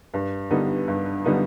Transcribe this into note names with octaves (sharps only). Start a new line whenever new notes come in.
G2
D3 G3 B3 D#4
G2
D3 G3 B3 D#4